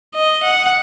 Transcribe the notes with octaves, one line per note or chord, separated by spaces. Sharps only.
D#5
F#5